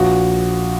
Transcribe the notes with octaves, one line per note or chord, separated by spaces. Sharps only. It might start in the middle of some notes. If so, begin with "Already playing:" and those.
Already playing: A#1 F#4